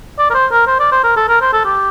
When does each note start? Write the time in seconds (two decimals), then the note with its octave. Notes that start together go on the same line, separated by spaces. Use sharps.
0.19 D5
0.30 A#4
0.34 C5
0.51 A#4
0.67 C5
0.80 D5
0.92 C5
1.04 A#4
1.17 A4
1.29 A#4
1.41 C5
1.53 A4
1.65 G4